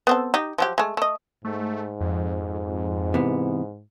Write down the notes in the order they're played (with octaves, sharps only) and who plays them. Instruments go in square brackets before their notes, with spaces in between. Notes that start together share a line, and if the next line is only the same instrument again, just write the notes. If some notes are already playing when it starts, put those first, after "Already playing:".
[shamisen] B3 C4 A4
D#4 G4
F3 F#3 G4
G#3 A3
A3 D#5
[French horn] G#2 [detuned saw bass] A3
[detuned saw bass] F2
[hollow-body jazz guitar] C3 E3 B3